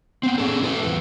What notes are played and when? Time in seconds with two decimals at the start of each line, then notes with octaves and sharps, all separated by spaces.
0.23 B3 C4
0.38 C#4 G#4 A4
0.63 E4 A4 B4
0.83 E2 E3 A4